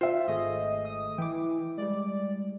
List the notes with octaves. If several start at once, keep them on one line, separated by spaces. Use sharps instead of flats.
F4 C5 E5
G#1 A3 G#4 D#5
D#6
E3 G5 D6
G3 G#3 D5